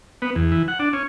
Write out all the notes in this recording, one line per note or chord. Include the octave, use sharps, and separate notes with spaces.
B3
E2
E3
F#5
D4
C#4